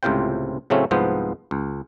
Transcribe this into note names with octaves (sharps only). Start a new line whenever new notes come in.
C#2 A2 C3 F4 C5 G5
A2 C#3 F#3 A3 C4 C#4
C2 G#2 F3 B3 C5
C#2